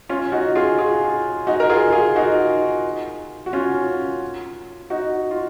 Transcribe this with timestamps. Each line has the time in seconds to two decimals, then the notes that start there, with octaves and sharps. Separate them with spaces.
0.09 C#4 F4
0.32 D#4 F#4
0.56 F4 G#4
0.78 F4 G#4
1.47 D#4 F#4
1.60 A#4
1.69 F4 G#4
1.93 F4 G#4
2.16 D#4 F#4
3.46 F#4
3.53 C#4 F4
4.90 D#4 F#4
5.31 F4